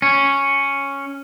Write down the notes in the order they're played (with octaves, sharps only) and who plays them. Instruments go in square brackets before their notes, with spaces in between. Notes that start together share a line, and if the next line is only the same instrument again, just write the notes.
[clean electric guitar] C#4